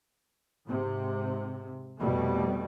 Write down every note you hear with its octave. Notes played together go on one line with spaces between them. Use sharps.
G#2 C3
F1 C2 F2 B2 G3 A3